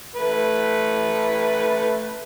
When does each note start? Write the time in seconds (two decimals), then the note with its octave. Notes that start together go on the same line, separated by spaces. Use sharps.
0.16 A3 B4